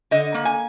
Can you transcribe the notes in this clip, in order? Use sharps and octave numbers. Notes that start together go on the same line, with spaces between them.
D3 D#5
A#3
G#5